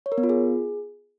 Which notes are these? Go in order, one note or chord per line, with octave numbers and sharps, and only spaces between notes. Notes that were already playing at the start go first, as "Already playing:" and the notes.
C#5
A#4
B3
F4
G#4